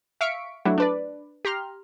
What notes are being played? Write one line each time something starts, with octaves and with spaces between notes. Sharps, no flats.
E5 F5 C#6 B6 C#7 D7
F#3 A3 D4 E4 F#4
D4 B4 D5
G4 A#5 C6 F6